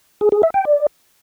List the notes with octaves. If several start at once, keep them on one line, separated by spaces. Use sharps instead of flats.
G#4
G#4
E5
G5
D5